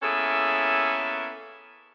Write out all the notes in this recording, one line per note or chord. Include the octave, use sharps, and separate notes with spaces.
A#3 B3 C#4 E4 G#4 A4